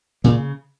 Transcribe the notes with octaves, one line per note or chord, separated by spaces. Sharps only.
A#2 C#3 A#3